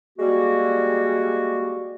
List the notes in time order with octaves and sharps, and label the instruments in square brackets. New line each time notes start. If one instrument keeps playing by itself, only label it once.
[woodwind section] G3 G#3 A#3 F#4